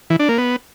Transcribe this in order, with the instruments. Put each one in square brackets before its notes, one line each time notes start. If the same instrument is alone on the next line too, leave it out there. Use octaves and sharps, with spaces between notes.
[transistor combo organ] E3
D4
A#3
B3